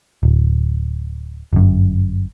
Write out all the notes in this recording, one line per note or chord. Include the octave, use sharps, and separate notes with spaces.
D1
G1 F#2